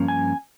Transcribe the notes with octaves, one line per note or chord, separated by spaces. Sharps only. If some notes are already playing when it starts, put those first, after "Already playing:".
Already playing: G2 F3 A#3 C#4
G#5